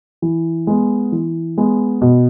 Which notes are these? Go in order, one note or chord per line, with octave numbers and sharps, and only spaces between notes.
E3
G#3 B3
E3
G#3 B3
B2